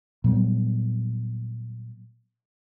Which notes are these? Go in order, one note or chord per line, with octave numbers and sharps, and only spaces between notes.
A#2 F#3 G3 B3